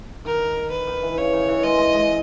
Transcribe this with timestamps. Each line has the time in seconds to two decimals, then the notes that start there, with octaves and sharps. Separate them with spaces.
0.25 D#3 A#4
0.71 B4
0.87 D#3
1.02 E3
1.17 C#3 C#5
1.33 D#3
1.48 E3
1.63 G#3 D#5
1.78 G#3
1.94 G#3